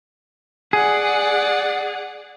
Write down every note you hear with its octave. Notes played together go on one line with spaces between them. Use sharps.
G#4 D5 F#5